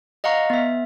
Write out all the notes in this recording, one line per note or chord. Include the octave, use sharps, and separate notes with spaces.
D#5 F5 F#5 A#5 C#6
B3 E5